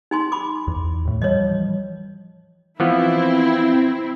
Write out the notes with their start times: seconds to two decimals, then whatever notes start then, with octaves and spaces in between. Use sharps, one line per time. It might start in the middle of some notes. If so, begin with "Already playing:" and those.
0.11 D#4 G#5 C6
0.32 B5 D6
0.67 E2
1.05 D#2 A2
1.22 E3 F3 G3 C#5 D#5
2.80 E3 F3 B3 C4 E4